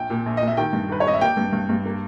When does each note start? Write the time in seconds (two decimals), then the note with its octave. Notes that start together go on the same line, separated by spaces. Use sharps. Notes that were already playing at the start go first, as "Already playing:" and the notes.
Already playing: A#1 G5
0.10 A#2
0.26 A#1
0.37 A#2 D#5
0.48 E5
0.57 D#3 G5
0.73 G2
0.89 D#3 B4
1.00 C#5
1.06 G#1 D#5
1.14 E5
1.21 A#3 G5
1.37 G2
1.53 G2
1.69 G2
1.85 A#3